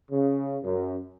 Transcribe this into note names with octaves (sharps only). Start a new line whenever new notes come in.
C#3
F#2